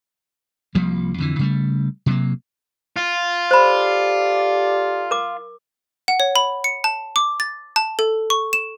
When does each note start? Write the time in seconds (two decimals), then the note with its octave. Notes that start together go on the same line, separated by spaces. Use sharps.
0.75 C2 F3 G3 A#3
1.18 F2 D3 E3
1.39 C#3 G3 A3
2.06 C3 F#3 A#3
2.97 F4
3.51 G4 A4 C5 D5 B5
5.11 A#4 D6
6.08 F#5
6.20 C#5
6.36 B5
6.64 C#7
6.84 A5
7.16 D6
7.40 A6
7.76 A5
7.99 A4
8.30 C#6
8.53 E7